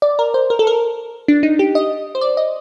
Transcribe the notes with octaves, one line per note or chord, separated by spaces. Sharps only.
D5
A#4
C5
A#4
A4
A#4
D4
D#4
G4
D#5
C5
D5
D#5